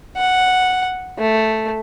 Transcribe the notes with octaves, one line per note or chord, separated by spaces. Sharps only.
F#5
A3